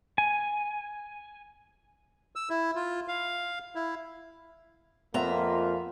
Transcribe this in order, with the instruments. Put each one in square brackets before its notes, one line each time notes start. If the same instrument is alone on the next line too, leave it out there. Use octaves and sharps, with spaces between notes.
[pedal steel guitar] G#5
[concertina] E6
E4
F4
F5
E4
[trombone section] F2 A#3 F4 [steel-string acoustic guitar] B3 E5 A#5